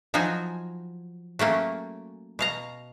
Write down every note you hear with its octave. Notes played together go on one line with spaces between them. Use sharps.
F3 F#3 D#4 F#4 G#5
F#3 A3 A#3 C#4
B2 F5 A#5